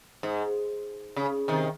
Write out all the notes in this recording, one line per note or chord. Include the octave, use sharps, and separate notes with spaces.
G#2
C#3
C3 D#3